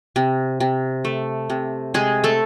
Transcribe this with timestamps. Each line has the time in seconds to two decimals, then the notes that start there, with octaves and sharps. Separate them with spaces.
0.16 C3
0.60 C3
1.05 A3
1.50 C3
1.94 C3 G#3 G#4
2.24 A3 A4